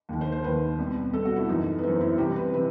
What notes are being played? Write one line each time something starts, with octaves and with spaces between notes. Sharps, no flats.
D#2 D#3
C5
C5
D#2 D#3 B4
C2 B2
C2 B2 A4
F#4
E4
F#2 E3 D#4
B3
F#2 E3 C4
E4
C2 C3 E3 G4
B4
C3 E3 B4